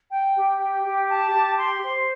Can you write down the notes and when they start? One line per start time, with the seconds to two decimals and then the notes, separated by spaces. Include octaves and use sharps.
0.11 G5
0.36 G4
0.61 G5
0.84 G4
1.10 A5
1.34 G4
1.59 C6
1.83 C5